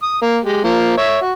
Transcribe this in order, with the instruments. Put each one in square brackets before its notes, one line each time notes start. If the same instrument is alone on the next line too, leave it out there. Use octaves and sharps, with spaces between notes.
[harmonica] D#6
A#3
G#3 G4
F3 A#3
C#5 E5
F#4